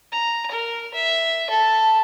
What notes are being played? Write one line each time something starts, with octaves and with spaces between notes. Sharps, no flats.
A#5
A#4
E5
A4